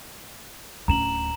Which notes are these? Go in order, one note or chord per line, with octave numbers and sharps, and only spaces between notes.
D1 C#4 A#5 E7 F#7